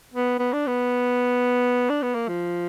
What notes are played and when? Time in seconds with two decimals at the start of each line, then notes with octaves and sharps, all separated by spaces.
0.14 B3
0.39 B3
0.53 D4
0.67 B3
1.90 D4
2.03 B3
2.15 A#3
2.28 F3